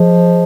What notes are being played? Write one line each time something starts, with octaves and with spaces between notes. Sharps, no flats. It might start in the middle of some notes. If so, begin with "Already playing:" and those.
Already playing: F3 G#4 D#5